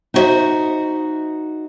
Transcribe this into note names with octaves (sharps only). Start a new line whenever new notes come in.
D#4 E4 F#4 C5 D#5 E5